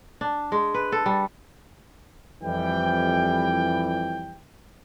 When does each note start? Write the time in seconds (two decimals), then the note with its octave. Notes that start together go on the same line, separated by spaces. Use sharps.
0.21 D4
0.52 G#3
0.74 B4
0.92 A4
1.06 G3
2.43 F2 E3 G3 G5